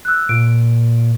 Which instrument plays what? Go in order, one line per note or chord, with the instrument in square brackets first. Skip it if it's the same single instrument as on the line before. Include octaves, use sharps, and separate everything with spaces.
[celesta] E6 F#6
[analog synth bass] A#2 [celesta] D7